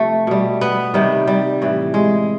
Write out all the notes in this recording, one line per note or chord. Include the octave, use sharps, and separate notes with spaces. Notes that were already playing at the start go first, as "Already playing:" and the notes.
Already playing: C3 F3 A3
B2 G3
B3
C3 D#3 G3
G3
A2 E3 G3
G#3